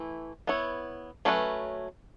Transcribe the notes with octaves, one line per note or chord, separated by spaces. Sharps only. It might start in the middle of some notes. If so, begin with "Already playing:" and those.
Already playing: E3 A3 E4
B3 E4 C#5
F#3 A3 C#4 F#4 B4